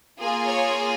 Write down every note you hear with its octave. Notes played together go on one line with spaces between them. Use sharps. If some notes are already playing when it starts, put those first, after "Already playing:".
A#3 F4 G#4
C#5